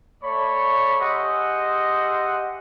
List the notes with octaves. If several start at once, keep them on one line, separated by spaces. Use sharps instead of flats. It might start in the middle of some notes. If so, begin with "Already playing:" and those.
A3 C#5 D5 B5 C#6
G4 G#4 C5 D#5 E5 F#5